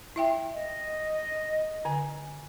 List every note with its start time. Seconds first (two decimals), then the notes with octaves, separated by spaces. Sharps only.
0.16 E4 E5 G5
0.54 D#5
1.85 D3 G#5